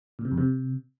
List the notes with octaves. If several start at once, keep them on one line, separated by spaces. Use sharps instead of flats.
A#2
C3
F2
C3